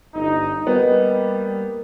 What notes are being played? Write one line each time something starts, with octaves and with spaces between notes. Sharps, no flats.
G1 D#4
G3 A#3 B3 D#4